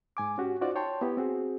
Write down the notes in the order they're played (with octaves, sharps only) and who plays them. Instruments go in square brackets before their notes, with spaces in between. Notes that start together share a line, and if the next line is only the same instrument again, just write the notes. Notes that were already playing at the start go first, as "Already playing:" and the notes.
[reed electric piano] G#2 G#5 D6
C#4 F#4 G4
D#4 F4 F#4 C5 D5
C#5 G5 A5 C6
B3 E4 G4
C4 F#4 G#4